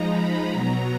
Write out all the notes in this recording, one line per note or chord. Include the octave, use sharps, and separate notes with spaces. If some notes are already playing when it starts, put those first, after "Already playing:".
Already playing: F3 G#3 D#4 A#5
B5
B2 F#3 B3 A#5